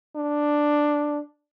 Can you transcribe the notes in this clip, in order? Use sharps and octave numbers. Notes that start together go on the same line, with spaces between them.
D4